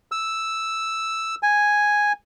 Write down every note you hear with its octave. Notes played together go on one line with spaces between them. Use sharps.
E6
G#5